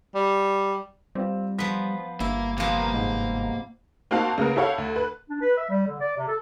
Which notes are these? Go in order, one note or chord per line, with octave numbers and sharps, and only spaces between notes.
G3
G3 C4 F4
F3 B3 B6
G1 A#3 E4
C3 F3 A#3 B3 F5
G#2
A#3 C4 D#4 F#4 F5 A5
C#3 A#3 B3 A#4
E4 G4 A4 C#5 F5 F#5
D2
B4
D4
B4
E5
G3
D3
D5
C3
A4